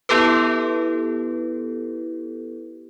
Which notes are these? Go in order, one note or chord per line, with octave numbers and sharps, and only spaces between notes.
B3 E4 G4 A4 B4